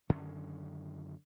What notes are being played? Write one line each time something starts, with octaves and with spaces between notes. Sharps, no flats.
F#2 D3 D#3 C#4